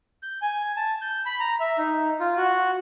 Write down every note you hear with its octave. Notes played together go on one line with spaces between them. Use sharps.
G6
G#5
A5
G6
B5
A#5
E5
D#4
F4
F#4